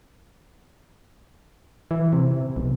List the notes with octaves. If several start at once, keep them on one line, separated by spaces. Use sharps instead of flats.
E3
C3
B1